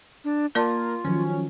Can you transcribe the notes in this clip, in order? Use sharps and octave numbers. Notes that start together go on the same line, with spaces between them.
D4
A#3 F4 A#4 D5 A5
D#3 F3 F#3 C#4